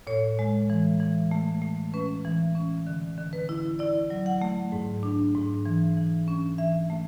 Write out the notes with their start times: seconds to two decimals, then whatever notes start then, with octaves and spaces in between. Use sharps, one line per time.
0.07 A2 C#5
0.39 G#3
0.70 E3
1.00 E3
1.31 A3
1.62 A3
1.94 C#4 B4
2.25 E3
2.55 C#4
2.87 D3
3.18 D3
3.33 B4
3.49 E4
3.79 E4 D5
4.10 F#3
4.26 F#5
4.42 A3
4.72 G#2
5.03 D4
5.35 G#2
5.66 E3
5.97 E3
6.28 C#4
6.58 E3 E5
6.90 A3